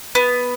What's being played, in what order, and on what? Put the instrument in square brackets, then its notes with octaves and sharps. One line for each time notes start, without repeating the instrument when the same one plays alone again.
[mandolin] B3